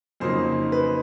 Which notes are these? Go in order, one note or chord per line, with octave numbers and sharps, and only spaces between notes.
F2 C#3 F#3 A#3 D#4 C5
B4